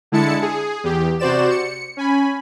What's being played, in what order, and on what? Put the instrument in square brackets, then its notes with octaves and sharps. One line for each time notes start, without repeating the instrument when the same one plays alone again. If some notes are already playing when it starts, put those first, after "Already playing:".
[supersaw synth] D3 G#3 E4 A5 C#7
G#4
E2 G4
C3 F#4 C5 D5 E7
C#7
C#4 G#5 B5